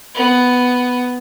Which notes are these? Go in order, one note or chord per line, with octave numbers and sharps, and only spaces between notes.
B3